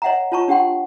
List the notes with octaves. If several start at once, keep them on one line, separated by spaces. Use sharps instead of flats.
C#5 D#5 E5 F#5 G5 A#5
F4 C#5 A5 A#5 C#6
D4 G4 F#5 G5 C6